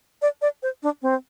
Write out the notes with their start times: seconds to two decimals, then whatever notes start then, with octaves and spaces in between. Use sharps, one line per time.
0.22 D5
0.42 D5
0.63 C5
0.83 D4
1.02 C4